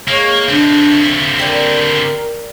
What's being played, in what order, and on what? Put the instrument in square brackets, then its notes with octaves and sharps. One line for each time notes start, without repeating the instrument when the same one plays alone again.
[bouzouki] G#3 [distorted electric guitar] A#3 [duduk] C#5
[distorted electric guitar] D3 C4 [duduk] D4
[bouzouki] G4 D5 [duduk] A#4